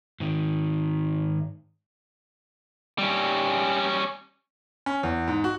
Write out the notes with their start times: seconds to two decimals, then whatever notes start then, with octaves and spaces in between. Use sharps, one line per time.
0.20 G#2 D#3
2.99 G3 C#4
4.86 C#4
5.03 E2
5.28 G#2
5.44 F#4